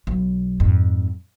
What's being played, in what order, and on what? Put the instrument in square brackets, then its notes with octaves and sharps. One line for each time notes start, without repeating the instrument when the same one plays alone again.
[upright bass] B1
F2 G#2